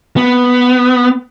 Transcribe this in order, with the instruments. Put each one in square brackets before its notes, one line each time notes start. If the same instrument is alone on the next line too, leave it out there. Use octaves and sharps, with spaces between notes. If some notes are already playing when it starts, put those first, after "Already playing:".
[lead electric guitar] B3